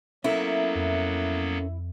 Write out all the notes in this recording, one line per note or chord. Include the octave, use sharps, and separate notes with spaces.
F#3 A#3 B3 C#4 E4 A4 A#4
F2